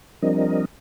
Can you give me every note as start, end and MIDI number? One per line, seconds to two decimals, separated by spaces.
0.22 0.65 53
0.22 0.65 55
0.22 0.65 60
0.22 0.65 62
0.22 0.65 70
0.22 0.65 75